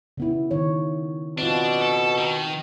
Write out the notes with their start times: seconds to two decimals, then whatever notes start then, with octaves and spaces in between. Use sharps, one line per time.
0.17 C#3 B3 E4
0.51 D#3 C#5
1.38 B2 C4 D4 F4
1.81 A4
2.18 D#3